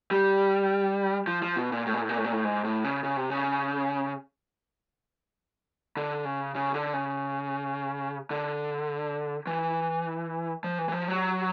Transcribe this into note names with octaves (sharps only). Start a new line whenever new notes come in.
G3
F3
F3
B2
A#2
A2
A#2
A2
A#2
A2
A#2
A2
G#2
A2
C#3
C#3
C3
C#3
D3
C#3
C#3
D3
C#3
D3
E3
F3
E3
E3
F3
F#3